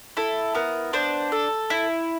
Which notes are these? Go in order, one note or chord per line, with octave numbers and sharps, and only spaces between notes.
E4 A4
B3 A#4
D4 C5
A4
E4